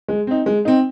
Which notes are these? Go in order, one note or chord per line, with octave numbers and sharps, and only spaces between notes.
G#3
C4 D#4
G#3
C4 D#4